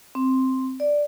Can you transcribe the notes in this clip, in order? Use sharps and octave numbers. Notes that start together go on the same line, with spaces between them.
C4
D5